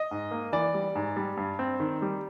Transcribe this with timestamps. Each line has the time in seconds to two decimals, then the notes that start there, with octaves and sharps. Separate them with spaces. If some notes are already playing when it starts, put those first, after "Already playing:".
Already playing: D#5
0.11 G#2
0.31 A#3
0.52 E3 D5
0.74 G3
0.95 G#2
1.17 G3
1.37 G2
1.59 C4
1.80 D#3
2.02 G3